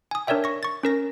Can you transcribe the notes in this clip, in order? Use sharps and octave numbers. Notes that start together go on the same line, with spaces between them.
G#5 D#6
D4 A#4 C#5 D5 E5 G5
C#6 A#6
C#6 A6
C#4 A#4 A#6